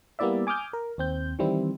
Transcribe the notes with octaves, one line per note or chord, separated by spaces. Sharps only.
G3 A#3 B3 E4 D5 E5
G#5 D6 D#6 F6 G6
A#4
D#2 C4 G6
D#3 E3 G3 C4 E4